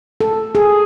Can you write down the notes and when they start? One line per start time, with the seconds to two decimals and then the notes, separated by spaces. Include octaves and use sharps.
0.21 A4
0.55 G#4